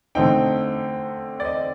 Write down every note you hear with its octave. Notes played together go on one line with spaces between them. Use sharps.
D3 A3 C4 D#4 G5
D5
D#5